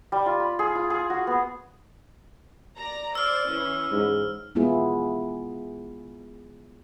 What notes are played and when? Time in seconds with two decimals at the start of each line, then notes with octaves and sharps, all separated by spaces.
0.12 G3
0.26 F4
0.40 B5
0.59 G#4
0.75 F4
0.90 G#4
1.10 F#4
1.27 B3
2.76 D5 A#5
3.15 C5 D5 E6 F6
3.48 E3 C#4
3.92 G#2
4.55 G#3 B3 E4 F4 G#4